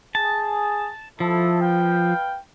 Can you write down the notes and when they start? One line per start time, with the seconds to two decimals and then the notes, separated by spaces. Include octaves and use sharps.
0.15 G#4 A5
1.20 F3 E4 A4
1.60 B4 F5 G5